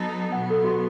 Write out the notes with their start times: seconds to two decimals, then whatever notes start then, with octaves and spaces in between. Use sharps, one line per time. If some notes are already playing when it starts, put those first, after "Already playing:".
Already playing: F#3 B3 D#4 A4
0.31 B2 F#3 B3 F#5
0.50 A4
0.64 F#4
0.68 G4